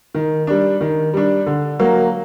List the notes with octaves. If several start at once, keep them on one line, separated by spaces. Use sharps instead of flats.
D#3
G3 D4
D#3
G3 D4
D3
F#3 A#3